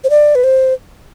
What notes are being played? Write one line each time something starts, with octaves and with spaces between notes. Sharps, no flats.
C5
D5
B4
C5